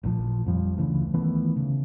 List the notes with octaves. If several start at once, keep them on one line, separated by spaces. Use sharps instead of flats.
A1 A#2 D#3 F3
F2 F3 G3
D2 C#3 E3 A3
D#3 E3 A3 B3
C#3